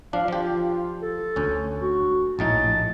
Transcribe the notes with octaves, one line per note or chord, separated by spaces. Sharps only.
F3 D4 F5
F3 F4 G4
A4
D2 C#4
F#4
A#1 A2 D#4 A5